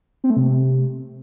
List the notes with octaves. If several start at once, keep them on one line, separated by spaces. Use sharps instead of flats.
C4
A3
C3